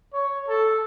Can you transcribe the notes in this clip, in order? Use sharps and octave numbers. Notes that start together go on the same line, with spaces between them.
C#5
A4